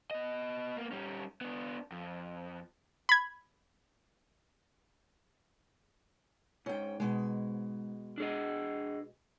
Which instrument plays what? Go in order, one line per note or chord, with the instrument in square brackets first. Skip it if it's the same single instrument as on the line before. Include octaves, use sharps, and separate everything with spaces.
[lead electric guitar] B3 D#5
A#3 B3
G3 C#4
B3 D4
F2
[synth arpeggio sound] B5 G#6
[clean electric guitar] C#2 G#2 [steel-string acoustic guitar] C#4 G5
[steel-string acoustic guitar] B2 G#3
[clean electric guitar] D4 G#4 D#5